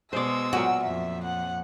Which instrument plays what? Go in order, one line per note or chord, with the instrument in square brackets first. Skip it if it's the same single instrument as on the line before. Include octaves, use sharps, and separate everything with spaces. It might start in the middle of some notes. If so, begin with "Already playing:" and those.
[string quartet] B2 G#3 [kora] C5 D5 [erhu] E6
[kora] A#2 F#3 A#4 [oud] F#4
[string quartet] F2 [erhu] E5
[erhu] F#5